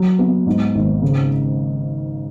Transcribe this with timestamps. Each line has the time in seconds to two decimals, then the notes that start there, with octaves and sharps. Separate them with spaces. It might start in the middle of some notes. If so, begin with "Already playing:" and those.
Already playing: F#3
0.19 B3
0.46 G#2
0.75 G#1
1.02 C#3